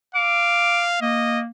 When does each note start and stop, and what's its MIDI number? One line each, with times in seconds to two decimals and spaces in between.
0.15 1.00 77
0.15 0.83 86
1.02 1.50 58
1.02 1.41 75